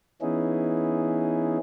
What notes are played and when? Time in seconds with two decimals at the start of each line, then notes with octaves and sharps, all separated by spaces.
0.21 E3 B3 C#4 D#4 E4 G#4